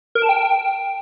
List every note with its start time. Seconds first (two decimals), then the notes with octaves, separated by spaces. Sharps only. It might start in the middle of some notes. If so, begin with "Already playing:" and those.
0.15 A#4
0.22 A5
0.29 G5